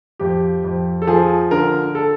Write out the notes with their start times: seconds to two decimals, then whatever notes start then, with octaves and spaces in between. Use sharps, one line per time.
0.20 F2 G4
0.64 F2
1.02 A4
1.07 F3 G#4
1.51 D3 A#4
1.95 A4